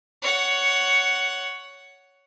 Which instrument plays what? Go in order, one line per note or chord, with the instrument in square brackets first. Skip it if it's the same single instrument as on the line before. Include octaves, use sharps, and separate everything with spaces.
[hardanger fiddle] C#5 F#5